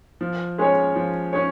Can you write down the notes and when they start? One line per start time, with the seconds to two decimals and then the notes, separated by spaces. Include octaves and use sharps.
0.21 F3
0.58 G#3 C#4 G#4 C#5
0.96 F3
1.33 C#4 G#4 C#5